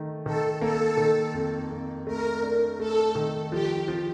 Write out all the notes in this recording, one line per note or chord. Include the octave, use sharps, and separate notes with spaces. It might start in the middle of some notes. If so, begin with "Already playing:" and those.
Already playing: D#3 A3
D#3 A4
A#3 A4
D#3
F2
F2
A3 A#4
D4
A3 A4
D#3
F3 G4
F3